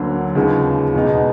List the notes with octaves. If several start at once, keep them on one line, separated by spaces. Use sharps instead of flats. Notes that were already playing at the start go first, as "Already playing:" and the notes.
Already playing: D2 D3 F#3 A#3
D#2 C#3 F3 G#3 B3
E2 B2 G#3 B3 D#4